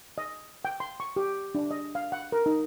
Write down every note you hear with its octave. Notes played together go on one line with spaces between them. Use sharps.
D#5
G5
C6
C#6
G4
D4
D#5
F5
F#5
A#4
D#4